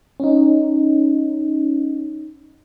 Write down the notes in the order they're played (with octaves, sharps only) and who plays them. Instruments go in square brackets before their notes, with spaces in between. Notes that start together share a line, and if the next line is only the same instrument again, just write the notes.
[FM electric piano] C#4 D#4